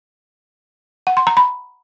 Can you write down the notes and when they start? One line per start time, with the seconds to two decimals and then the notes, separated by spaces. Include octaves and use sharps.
1.07 F#5
1.17 C6
1.27 A#5
1.37 B5